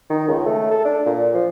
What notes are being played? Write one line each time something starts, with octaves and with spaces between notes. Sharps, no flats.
D#3
C#2
A3
A4
D4
A#2
F3